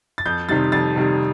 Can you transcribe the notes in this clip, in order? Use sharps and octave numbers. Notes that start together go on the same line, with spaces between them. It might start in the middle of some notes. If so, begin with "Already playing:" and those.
A6
F2 G6
C3 D#3 G3 A6
F2 A6
C3 D#3 G3